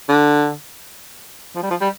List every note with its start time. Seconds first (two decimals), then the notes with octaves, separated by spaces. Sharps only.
0.09 D3
1.56 F3
1.63 G3
1.70 F3
1.81 G3